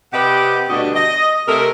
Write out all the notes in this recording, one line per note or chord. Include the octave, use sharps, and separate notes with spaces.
C3 G4 B4 D5 D#5 F#5
D2 B2 G3 D4 F#4 D#5
D#5
C3 A3 A4 A#4